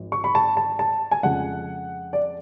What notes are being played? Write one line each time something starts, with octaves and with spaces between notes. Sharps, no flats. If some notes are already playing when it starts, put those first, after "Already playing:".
Already playing: G#1 F3
C#6
B5
A5
A5
A5
G#5
F2 C#3 G#3 F#5
D5